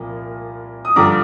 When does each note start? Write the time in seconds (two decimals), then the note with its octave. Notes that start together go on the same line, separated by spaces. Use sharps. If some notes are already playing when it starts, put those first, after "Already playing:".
Already playing: C2 A#2 F3 A#3
0.85 D#6
0.96 G2 D3 F3 A#5 D6